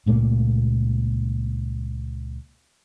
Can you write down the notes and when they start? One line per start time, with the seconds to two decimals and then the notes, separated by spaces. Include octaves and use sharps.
0.06 C#2 A#2 A3 A#3